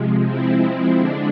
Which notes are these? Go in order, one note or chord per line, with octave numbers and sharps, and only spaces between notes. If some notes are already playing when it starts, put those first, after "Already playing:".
Already playing: C3 F3 G#3
F3 G#3 C4 E4
D3 G#3 D4